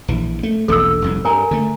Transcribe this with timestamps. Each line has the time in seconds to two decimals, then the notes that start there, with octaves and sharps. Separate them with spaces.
0.08 A#1 E3
0.43 A3
0.68 E1 A#1 A#2 A4 E6
1.02 F1 C2 G#2
1.25 G2 A#4 G#5 A#5
1.51 D3 A3